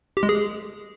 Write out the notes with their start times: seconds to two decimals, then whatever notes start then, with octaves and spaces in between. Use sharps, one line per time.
0.17 G4
0.23 G#3
0.29 G#4